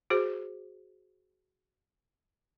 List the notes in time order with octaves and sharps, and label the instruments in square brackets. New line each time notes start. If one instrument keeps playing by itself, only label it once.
[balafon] F#4 G#4 C5